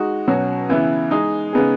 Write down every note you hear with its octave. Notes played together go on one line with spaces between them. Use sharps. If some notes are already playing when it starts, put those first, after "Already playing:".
Already playing: G#3 D#4 F#4
B2 F#3 C#4 F#4
C#3 E3 B3 E4
G#3 D#4 G#4
C#3 G#3 B3 D#4 G#4